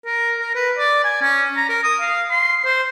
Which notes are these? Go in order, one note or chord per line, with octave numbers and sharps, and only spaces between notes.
A#4
A#4
B4
D5
G#5
C#4
A#5
A#4
D#6
F5
C6
C5